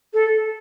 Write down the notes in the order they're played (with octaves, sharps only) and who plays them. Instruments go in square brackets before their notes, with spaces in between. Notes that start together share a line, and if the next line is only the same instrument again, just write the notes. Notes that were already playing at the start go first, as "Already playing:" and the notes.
[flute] A4